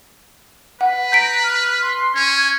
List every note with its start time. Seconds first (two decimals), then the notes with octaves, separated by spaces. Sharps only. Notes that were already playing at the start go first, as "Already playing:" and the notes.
0.81 B4 F#5
1.12 A#5 G6 B6 D7
1.44 F6
1.82 C6
2.15 C#4 G#6